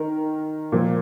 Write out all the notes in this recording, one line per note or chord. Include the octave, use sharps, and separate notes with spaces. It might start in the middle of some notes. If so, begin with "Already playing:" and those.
Already playing: D#3 A#4
A#2 F3